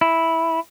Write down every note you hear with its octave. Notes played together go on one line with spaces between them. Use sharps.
E4